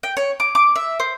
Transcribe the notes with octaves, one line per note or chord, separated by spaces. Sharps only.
G5
C#5
D6
D6
E5
C5